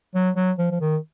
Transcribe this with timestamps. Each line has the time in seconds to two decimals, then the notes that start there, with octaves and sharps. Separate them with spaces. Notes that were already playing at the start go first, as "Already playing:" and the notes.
0.15 F#3
0.36 F#3
0.59 F3
0.71 F3
0.81 D#3